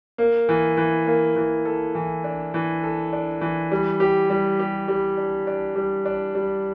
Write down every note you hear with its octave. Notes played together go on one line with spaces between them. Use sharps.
A#3
E3
E3
A#3
E3
A4
E3
D4
E3
A4
D4
E3
G3
G4
G3
G4
G3
D4
D4
G3
D4
G3